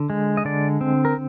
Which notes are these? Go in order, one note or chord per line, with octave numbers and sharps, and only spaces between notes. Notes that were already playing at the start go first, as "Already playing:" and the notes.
Already playing: D3
G#3
D#5
D3 D5
C4
A#4